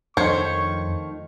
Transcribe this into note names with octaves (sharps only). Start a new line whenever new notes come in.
F2 D#3 F3 A3 D4 C5 C#5 C#6